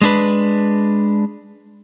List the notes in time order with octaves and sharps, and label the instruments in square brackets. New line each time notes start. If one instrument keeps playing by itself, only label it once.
[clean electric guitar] G#3 D4 B4